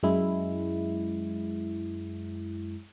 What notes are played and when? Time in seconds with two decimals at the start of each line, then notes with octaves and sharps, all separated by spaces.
0.03 F#2 G#3 E4